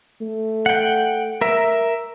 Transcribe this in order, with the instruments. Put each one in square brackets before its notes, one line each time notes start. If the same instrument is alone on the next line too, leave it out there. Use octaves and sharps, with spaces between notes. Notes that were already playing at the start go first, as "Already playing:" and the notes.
[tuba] A3
[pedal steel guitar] F#5 G5
A#4 E5